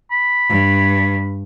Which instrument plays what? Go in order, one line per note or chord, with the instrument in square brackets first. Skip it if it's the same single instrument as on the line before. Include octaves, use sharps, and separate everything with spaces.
[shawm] B5
[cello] G2